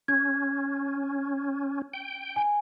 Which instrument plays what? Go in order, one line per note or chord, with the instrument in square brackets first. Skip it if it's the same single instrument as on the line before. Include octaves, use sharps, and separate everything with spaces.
[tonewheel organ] C#4 [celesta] G#6
[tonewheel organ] G5
[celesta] G#5